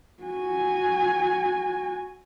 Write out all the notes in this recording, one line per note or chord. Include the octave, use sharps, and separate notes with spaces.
F#4 G#5